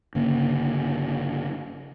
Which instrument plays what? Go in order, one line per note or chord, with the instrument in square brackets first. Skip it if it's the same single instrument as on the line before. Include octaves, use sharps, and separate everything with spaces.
[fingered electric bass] G1 C#3 A#3